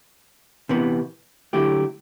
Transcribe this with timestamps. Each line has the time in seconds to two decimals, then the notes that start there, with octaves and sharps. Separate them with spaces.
0.69 C3 E3 B3
1.53 D3 F#3 A3 E4 G4